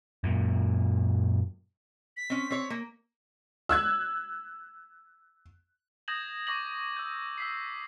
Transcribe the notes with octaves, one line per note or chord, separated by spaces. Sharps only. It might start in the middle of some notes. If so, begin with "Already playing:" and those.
F#2 A#2
B6
C4 C#4
C4 C#5
A#3
E6 F#6 G#6
D#6 G6 G#6 A#6 E7 F#7
C#6 D6 A#6 F#7
E6 G6
E6 B6 C7